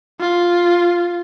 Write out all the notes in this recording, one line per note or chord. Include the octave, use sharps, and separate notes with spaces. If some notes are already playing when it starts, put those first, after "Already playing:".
F4